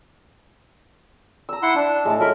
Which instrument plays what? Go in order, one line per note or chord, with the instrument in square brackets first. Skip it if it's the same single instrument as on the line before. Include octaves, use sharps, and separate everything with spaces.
[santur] A#5 E6
[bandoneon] E4 F#5 C6
D4
[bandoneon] A2 [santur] G#3 A3 A5
[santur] F#3 B5 C#6 [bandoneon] A#4